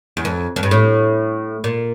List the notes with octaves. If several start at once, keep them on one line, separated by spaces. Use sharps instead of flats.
E2
F2
F2
G2
A2
A#2